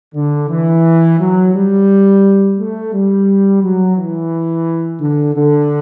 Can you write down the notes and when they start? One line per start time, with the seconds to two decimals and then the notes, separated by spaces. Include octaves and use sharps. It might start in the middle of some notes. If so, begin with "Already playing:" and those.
0.14 D3
0.49 E3
1.19 F#3
1.53 G3
2.57 A3
2.92 G3
3.61 F#3
3.96 E3
5.00 D3
5.35 D3